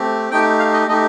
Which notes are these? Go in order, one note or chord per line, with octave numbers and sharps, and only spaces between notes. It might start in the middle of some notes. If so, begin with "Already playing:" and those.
Already playing: A3 C4 G4
A3 D#4 G4 G5
F5
D#5
A3 D#4 G4 D#5